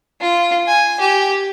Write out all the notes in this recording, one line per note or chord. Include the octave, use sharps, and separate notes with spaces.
F4
G#5
G4